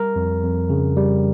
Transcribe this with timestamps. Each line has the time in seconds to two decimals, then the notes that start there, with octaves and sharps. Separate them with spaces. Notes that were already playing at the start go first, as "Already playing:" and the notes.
Already playing: G3 A#4
0.16 F2
0.43 F2
0.70 C#3
0.97 G3